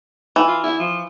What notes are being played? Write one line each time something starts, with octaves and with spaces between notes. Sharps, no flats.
E3
F4
E4
F3